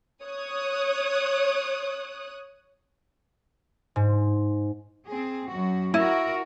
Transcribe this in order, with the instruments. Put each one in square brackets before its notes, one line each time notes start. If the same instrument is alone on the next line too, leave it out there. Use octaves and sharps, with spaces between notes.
[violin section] C#5 D#6 F#6
[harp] G#2
[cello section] C4 G#4
F#2 F#4
[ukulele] E4 [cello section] F#4 A#4